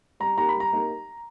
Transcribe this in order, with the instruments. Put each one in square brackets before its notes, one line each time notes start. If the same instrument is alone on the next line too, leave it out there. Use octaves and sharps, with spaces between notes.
[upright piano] G3 [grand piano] A#5
[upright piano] A#3 D#4 G4 A#4 [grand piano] A#5
[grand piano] B5
[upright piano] G3
[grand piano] A#5
[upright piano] A#3 D#4 G4 A#4